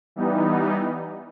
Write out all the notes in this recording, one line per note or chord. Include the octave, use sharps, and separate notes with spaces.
E3 G3 B3 D#4